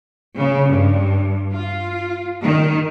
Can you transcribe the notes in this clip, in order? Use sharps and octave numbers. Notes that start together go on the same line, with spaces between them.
C#3
G2
F4
D#3